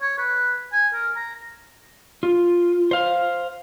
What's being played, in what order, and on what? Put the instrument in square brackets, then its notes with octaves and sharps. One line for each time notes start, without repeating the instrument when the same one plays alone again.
[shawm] C#5
B4
G#5
A#4
A#5
[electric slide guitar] F4
C5 F5